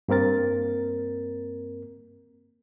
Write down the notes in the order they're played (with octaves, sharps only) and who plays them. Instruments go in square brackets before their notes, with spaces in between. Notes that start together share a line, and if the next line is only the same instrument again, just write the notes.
[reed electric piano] G2 A#3 C4 A#4 A6